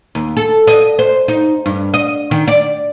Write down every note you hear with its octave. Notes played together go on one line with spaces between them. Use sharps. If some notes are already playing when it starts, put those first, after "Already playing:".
D#2
A4
D#5
C5
D#4
G2
D#5
D#3
D5